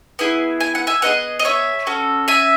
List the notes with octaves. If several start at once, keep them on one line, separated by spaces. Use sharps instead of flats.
B3 E4 G#4
G#5
F#5
E5 G#5
B3 E4 G#4 D#5 F#5
D#5
C#5 E5
C#4 F#4 A4
E5 G#5